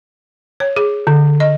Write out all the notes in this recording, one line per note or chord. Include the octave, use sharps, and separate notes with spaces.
C#5
G#4
D3
D#5